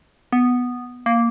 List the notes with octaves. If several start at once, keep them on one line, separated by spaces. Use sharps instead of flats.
B3
A#3